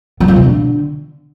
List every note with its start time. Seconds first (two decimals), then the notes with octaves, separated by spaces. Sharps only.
0.20 F#3
0.28 F3
0.36 B2
0.44 D3